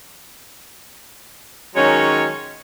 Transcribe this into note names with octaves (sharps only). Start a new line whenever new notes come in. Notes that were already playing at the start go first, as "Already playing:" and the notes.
D#3 F#3 G#3 C#4 C#5